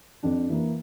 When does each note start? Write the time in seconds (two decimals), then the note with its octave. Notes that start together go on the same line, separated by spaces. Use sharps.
0.23 F2 D4
0.49 E3 A#3